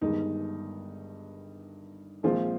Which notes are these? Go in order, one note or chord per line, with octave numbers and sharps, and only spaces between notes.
G1 G2 D#3 G#3 D#4
A#1 A#2 F3 G#3 C4 F4